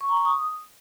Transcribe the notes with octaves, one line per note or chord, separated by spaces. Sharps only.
C#6
A#5
C#6
D#6